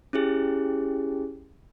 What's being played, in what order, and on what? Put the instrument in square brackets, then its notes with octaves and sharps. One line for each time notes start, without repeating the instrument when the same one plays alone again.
[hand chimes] C#4 E4 G4 G#4